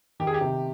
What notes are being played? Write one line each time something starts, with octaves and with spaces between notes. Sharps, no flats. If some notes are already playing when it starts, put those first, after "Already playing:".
D#3 G4
G#4
G4
C3